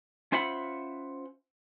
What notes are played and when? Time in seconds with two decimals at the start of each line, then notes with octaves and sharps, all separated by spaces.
0.32 C#4 F4 C5 E5 F#5 B5